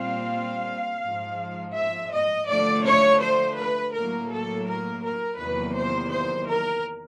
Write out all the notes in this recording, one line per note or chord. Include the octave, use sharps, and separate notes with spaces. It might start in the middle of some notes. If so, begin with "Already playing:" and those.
Already playing: A#2 G3 C4 F4 F5
G#2 F3 G#3
E5
D#5
D3 F3 A3 D5
C#5
C5
B4
A2 F#3 A#3 A#4
A4
A#4
A#4
E2 C3 D#3 F#3 A#3 B4
C5
C5
A#4